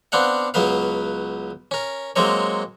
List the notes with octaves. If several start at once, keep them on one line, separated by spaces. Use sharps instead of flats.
B3 C4 D4 F5 F#5
C#2 F#3 B3 B4 F5
C#4 A#4
F#3 G#3 A#3 C4 A#4 C#5